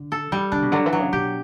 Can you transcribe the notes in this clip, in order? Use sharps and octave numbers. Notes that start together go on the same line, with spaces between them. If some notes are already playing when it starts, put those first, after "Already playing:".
Already playing: D3
A4
E3 G3
D3 D4
B2
D3 F#3
E3
F#3
C#3
B2 G4